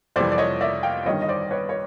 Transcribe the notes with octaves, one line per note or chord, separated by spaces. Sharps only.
F2 C3 E3 G3 C5 D5
D5
C#5 D#5
D5 E5
F5 G5
G1 G2 D#3 G3 C#5 D#5
D#5
C5 D5
B4 C#5
C#5